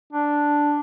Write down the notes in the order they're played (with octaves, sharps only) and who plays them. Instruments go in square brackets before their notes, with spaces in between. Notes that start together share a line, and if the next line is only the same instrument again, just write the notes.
[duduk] D4